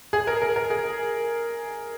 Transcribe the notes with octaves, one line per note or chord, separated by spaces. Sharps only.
G#4
A#4
A#4
A#4
G#4